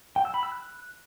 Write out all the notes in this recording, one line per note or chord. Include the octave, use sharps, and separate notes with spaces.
G5
E6
B5
E6
F#6